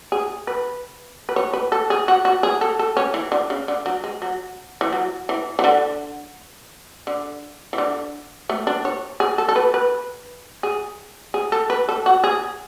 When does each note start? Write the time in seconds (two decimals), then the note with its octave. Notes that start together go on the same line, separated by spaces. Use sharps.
0.12 G#4
0.47 B4
1.29 B4
1.36 C#5
1.53 B4
1.72 A4
1.90 G#4
2.08 F#4
2.25 F#4
2.43 G#4
2.61 A4
2.79 A4
2.97 C#4
3.14 E3
3.32 D3
3.50 C#3
3.68 D3
3.86 F#3
4.04 G#3
4.22 F#3
4.81 E3
4.92 F#3
5.29 E3
5.59 E3
5.64 D3
7.07 D3
7.73 E3
7.78 D3
8.49 A3
8.67 D4
8.85 C#5
9.20 G#4
9.38 A4
9.49 A4
9.56 B4
9.74 B4
10.63 G#4
11.34 G#4
11.52 A4
11.70 B4
11.89 A4
12.06 F#4
12.24 G#4